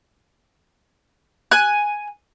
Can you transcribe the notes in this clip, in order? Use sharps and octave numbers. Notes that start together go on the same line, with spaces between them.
G#5 F#6